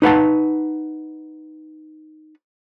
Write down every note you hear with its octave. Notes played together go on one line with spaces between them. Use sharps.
D#4 B4 F#5 A5